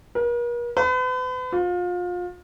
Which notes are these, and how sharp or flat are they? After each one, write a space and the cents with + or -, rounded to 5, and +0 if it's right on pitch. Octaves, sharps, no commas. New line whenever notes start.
A#4 +45
B4 +40
F4 +30